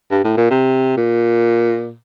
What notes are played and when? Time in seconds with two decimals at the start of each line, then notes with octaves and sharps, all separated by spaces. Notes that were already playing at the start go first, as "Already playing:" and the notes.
0.11 G2
0.24 A2
0.37 A#2
0.50 C3
0.97 A#2